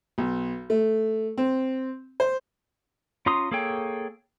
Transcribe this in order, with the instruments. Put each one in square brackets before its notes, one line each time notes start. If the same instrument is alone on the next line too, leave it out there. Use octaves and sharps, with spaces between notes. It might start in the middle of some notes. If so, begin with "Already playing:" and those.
[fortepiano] B1
A3
C4
C5
[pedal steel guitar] C#4 F4 A#5 C6 D#6
A#3 G#4 A4 C#5 G5